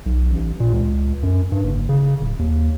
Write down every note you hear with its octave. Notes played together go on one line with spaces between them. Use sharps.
B1
A1
A#2
C#2
F#2
G2
F#1
C#3
D1
D#2